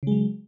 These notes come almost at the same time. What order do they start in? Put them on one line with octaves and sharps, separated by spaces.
C#3 G#3 F#3